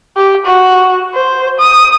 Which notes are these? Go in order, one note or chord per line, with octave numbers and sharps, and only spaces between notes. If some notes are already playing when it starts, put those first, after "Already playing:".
G4
F#4
C5
D#6